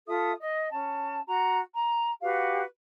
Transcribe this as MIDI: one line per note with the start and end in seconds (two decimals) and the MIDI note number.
0.07 0.31 65
0.07 0.31 69
0.07 0.31 76
0.07 0.31 87
0.39 0.69 75
0.70 1.20 61
0.70 1.20 81
1.27 1.59 66
1.27 1.59 82
1.75 2.10 82
2.21 2.62 66
2.21 2.62 67
2.21 2.62 71
2.21 2.62 77